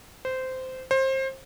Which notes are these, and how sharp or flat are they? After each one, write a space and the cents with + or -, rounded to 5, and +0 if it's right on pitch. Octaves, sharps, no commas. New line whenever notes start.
C5 -15
C5 +25